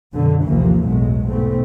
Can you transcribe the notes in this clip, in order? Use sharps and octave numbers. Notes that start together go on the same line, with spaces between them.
F#2 B2 D3 F#3
A1 D#2 C3 E3 F3 A#3
B1 E2 A2 F#3 G#3
E2 G#2 B2 A3 C4